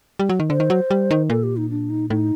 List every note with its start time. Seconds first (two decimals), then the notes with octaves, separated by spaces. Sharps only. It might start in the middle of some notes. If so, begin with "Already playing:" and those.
0.19 G3
0.29 F#3
0.40 D#3
0.50 D3 C5
0.60 D#3
0.70 F#3
0.91 G3
1.11 D#3
1.30 A#2 A4
1.43 G4
1.57 D#4
1.70 D4
1.90 D#4
2.10 A2 D#4